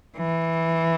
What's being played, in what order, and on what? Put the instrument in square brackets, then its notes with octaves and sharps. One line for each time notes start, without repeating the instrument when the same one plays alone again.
[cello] E3